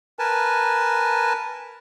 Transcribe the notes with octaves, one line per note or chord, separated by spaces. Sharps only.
A#4 B4 G#5 A5